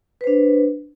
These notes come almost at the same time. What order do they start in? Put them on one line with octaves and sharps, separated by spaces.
B4 C5 D4